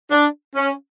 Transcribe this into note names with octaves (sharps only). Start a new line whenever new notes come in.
D4
C#4